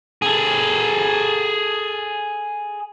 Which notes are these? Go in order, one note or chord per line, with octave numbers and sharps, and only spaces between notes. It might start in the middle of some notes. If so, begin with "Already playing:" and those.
G#4 A4